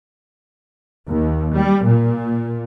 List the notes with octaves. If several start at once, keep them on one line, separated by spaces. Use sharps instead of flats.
D#2
G3
A#2